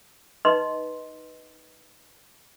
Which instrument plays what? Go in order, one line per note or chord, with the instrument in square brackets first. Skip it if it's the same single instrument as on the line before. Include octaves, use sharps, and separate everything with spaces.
[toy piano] D#4 B4 D#5 C6